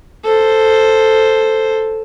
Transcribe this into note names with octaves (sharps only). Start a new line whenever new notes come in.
A4 C5